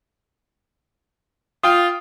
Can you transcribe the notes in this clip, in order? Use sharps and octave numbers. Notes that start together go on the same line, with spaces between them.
F4 G5 D#6